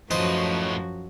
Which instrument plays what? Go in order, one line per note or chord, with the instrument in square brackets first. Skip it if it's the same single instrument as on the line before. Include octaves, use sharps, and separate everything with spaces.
[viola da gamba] F#2 F3 F#4 [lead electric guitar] A2 B4 [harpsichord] D#4 C5 A5